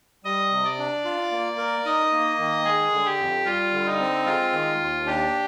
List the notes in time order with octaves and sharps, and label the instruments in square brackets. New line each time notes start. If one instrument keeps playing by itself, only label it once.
[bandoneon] G3 [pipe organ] D#5
[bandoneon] C3
[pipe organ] D5
[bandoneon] D4
F4
A#3
A#4
[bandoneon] D#4 [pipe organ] D#5
[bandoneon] A#3
D#3
[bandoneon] G#3 [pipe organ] G#4
[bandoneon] D3
[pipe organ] G4
[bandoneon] F2
[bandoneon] G3 [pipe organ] F4
[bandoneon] D3
[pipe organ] D#4
[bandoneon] C4
[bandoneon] G#3 [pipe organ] F4
[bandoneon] D#3
D#2
[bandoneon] D4 [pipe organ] G4